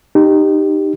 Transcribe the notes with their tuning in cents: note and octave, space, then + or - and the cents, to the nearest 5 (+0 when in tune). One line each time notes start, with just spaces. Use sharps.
D#4 -20 G4 +0